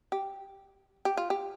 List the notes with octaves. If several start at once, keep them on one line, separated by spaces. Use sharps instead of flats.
G4
G4
F4
G4